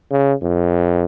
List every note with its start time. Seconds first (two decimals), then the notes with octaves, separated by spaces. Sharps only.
0.11 C#3
0.42 F2